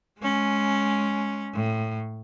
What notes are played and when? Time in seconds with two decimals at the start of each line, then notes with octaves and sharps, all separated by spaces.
0.20 G#3 C#4
1.54 A2